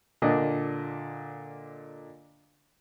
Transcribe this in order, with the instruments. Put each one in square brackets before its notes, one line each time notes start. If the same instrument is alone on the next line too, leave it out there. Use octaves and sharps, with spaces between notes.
[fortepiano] A#2 D3 D4 D#5